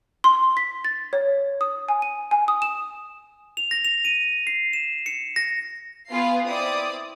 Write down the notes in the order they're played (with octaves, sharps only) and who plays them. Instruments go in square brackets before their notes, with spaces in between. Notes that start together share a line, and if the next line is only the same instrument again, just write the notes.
[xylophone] C6
B6
A6
C#5
D#6
G#5
D#7
G#5
D#6
E7
[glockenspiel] F7
A#6
F7
D#7
C7
E7
C#7
A#6
[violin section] B3 F4 G#4 B4 F5 C7
C4 E4 D5 D#6